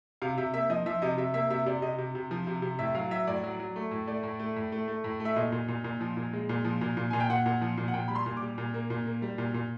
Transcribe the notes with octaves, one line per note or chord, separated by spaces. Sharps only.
C3 F5
C3 E5
A#3 E5
F3 D#5
F3 E5
C3 D#5
C3 E5
A#3 E5
C3 E5
C3 D5
C3 D#5
C3
C3
F3
C3
C3
A2 E5
F#3 F5
F#3 E5
A2 D5
F#3
F#3
A3
A2
A3 D5
A2
A3
A2
A3
A3
A2
A3
E5
A#2 D#5
A#2
A#2
A#2
F3
A#2
G#3
A#2
F3
A#2
A#2
A#2 G#5
G5
A#2 F#5
A#2
F3
A#2
F#5
A#2 G5
G3 B5
C6
A#2
D6
G3
A#2
A#3
A#2
A#3
G3
A#2
A#2